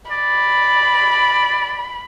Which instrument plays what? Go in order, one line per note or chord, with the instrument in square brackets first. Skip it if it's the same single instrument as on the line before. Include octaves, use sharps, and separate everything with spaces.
[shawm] D5 [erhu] B5